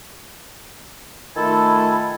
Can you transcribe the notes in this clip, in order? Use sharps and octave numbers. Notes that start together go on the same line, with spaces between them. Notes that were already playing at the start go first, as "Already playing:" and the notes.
D#3 A3 F4 A4 G#5 B5